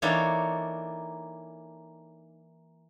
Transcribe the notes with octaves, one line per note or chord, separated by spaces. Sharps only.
E3 A#3 D4 D#4 A4 C#5